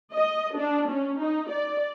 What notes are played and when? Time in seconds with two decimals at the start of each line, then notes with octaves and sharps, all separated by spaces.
0.14 D#5
0.58 D4
0.89 C#4
1.21 D#4
1.51 D5